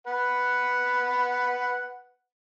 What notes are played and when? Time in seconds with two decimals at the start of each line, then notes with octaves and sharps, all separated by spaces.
0.07 B4 F#5